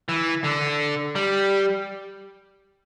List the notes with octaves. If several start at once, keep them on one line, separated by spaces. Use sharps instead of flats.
E3
D3
G3